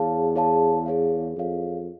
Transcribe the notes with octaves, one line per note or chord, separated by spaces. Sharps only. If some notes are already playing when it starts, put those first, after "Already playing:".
Already playing: E2 G#4 C#5 F5 A5
G#4 C#5 F5 A5
G#4 C#5 F5
F2 G#4 C#5 F5